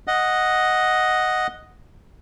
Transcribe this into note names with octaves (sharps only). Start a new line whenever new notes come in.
D#5 F#5